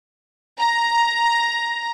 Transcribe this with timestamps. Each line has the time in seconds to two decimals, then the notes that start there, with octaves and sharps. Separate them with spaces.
0.58 A#5